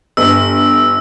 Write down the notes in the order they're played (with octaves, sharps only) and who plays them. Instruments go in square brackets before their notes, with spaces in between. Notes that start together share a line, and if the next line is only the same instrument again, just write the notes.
[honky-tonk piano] G1 [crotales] E6